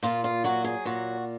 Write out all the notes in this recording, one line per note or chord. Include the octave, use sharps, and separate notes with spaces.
A#2 F4
F4
F#3 F#4
G#4
A#2 F#4